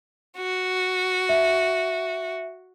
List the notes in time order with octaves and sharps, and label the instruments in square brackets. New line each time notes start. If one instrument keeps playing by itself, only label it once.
[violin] F#4
[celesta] E5